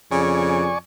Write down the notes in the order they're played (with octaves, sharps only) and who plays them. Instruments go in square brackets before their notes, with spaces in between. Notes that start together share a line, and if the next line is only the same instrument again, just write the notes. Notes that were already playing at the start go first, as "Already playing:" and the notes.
[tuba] F2 [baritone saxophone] C#3 [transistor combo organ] D5 G#5 C#6